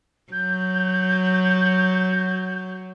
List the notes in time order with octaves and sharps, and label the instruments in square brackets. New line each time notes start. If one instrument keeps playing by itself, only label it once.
[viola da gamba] F#3 [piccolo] G6